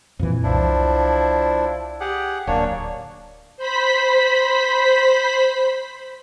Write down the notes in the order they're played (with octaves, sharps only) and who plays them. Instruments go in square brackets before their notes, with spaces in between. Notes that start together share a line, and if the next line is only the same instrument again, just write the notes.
[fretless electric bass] F2 A#2 E3
[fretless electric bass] C2 [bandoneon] F3 D4 E4
[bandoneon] G4 G#4 F#5
[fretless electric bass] D1 [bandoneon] A#3 D4 C#5
[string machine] C5 B5 B6